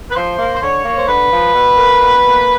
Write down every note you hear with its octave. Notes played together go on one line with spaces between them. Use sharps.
B4
F3 C5
A#3
C5
D3 C#5
A#3
C5
D3 B4
F3
B2
A#3
B2
A#3